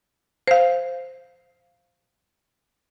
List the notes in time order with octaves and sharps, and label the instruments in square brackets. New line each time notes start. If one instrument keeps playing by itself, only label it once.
[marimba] C5 F5